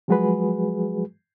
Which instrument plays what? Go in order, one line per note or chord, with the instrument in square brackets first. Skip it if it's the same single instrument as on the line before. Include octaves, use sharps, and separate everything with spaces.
[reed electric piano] F3 F#3 G#3 F#4 G#4 B4